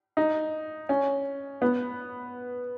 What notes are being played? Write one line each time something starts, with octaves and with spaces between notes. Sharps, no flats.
D#4
C#4
B3